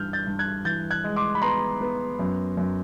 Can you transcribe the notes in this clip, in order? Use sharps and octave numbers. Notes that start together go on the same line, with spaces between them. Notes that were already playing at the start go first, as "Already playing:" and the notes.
Already playing: G2 E3 G3 F6 G6
G6 A6
G2
F#6 G#6
E3 G6 A6
F#6 G#6
G#3
C6 D6
B5
B3 A#5 C6
B3
F#2
F#2